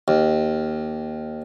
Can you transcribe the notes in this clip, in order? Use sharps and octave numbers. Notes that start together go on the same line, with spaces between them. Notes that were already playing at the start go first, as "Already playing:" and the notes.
D#2